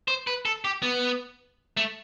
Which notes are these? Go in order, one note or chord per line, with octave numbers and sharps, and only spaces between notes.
C5
B4
A4
G4
B3
A3